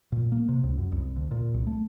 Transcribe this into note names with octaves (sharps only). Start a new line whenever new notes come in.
A#2
A#3
C3
C#2
F#2
C2
D2
A#2
C2
A3